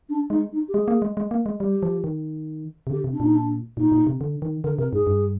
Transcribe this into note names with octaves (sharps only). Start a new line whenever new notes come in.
D4
G#3 D#4
D#4
G4
G#3 G#4
A#3
G#3
G#3
A#3
G#3
G3 G4
F3
D#3
C3
D3 G4
C3
D4
A#2 D#4
D4
A#2 D#4
A#2
C3
D3
D#3
D3 A#4
C3 A#4
G#2 G#4
G2